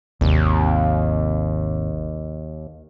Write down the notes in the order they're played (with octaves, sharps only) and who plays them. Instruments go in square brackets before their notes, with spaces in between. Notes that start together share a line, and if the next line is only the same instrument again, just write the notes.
[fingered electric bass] G#1 C3 [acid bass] D#2